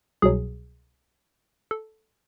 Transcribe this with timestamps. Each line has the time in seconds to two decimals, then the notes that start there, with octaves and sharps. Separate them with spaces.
0.22 C2 B2 F#3 G#4
1.71 A4